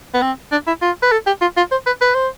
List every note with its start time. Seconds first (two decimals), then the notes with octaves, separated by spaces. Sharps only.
0.14 B3
0.22 C4
0.52 D4
0.67 E4
0.82 F4
1.02 B4
1.12 A4
1.26 G4
1.41 F4
1.57 F4
1.71 C5
1.86 B4
2.01 B4
2.14 C5